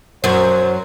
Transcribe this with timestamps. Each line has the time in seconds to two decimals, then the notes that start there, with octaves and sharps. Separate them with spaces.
0.24 F#2 F#3 C5